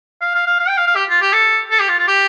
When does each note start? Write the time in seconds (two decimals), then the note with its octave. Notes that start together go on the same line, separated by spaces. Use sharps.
0.21 F5
0.35 F5
0.46 F5
0.59 F5
0.68 G5
0.77 F5
0.87 F5
0.96 G4
1.09 F4
1.22 G4
1.33 A4
1.71 A4
1.79 G4
1.89 F4
1.99 F4
2.08 G4